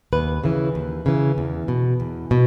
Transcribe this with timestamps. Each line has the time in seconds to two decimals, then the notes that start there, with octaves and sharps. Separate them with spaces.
0.13 D#2 B4
0.44 C#3 E3
0.75 D#2
1.06 C#3 E3
1.38 E2
1.68 B2
2.00 E2
2.31 B2